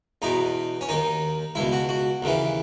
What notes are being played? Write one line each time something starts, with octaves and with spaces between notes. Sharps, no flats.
E2 B2 D#4
C#4
D#2 D#3 D#4
C#2 B2 E4
F#4
F#4
D#2 C#3 E3